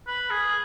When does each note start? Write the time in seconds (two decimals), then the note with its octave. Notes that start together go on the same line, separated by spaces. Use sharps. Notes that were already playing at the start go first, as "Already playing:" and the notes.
0.07 B4
0.30 G#4